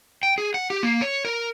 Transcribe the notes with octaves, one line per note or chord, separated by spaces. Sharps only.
G5
G#4
F#5
G4
A#3
C#5
A#4